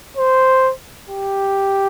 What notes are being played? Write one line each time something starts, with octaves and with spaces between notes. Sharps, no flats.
C5
G4